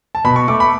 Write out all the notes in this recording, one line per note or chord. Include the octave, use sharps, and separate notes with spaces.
A5
B2 B5
C#6
A3 D6
B5